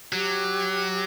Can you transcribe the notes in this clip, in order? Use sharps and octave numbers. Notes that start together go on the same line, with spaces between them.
F#3 G4